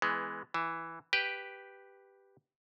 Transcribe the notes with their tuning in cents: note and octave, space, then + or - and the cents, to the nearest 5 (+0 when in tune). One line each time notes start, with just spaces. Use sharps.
E3 +0 G#3 +5 B3 +20
E3 +0 E5 +15
G4 +0 B4 +0 G5 +0